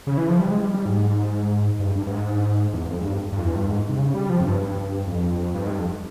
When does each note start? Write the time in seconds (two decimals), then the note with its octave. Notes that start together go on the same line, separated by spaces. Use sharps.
0.07 C#3
0.17 E3
0.28 F3
0.39 G3
0.51 G#3
0.63 G3
0.74 G3
0.86 G#2
1.80 G2
1.95 G2
2.07 G2
2.11 G#2
2.73 E2
2.89 F2
3.01 G#2
3.05 G2
3.32 G2
3.39 F2
3.44 E2
3.55 G2
3.68 G#2
3.89 C3
3.99 C#3
4.14 G3
4.30 F3
4.40 F2
4.45 G2
4.61 G2
5.07 F2
5.55 G2
5.66 G#2
5.70 G2
5.79 F2